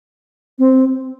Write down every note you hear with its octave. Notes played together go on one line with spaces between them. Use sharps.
C4